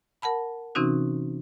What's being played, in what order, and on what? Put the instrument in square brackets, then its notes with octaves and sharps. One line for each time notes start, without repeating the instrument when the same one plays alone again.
[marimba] A#4 F#5 A5 B5
C3 E3 C4 C#4 D#4 F#4